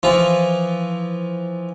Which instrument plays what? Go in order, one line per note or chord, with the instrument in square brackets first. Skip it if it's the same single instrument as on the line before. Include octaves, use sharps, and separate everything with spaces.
[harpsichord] E3 F3 F4